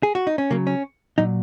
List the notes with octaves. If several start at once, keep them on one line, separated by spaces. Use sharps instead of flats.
G#4
F#4
D#4
C#4
C#3 F#3 A#3
C#4
A#2 F#3 D#4